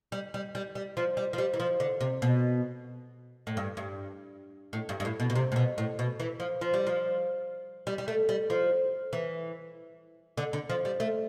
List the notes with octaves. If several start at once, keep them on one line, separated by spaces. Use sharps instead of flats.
G3
G3
G3
G3
F3
G3
F3
G3
E3
F3
D3
C3
B2
A2
G2
G2
A2
G2
G2
A2
B2
B2
C3
A2
B2
A2
B2
E3
F3
F3
G3
F3
G3
G3
A3
G3
F3
E3
D3
D3
F3
G3
A3